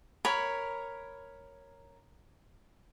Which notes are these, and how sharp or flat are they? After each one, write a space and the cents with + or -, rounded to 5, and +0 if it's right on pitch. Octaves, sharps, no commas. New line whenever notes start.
A#4 +0 C#5 +0 B5 +0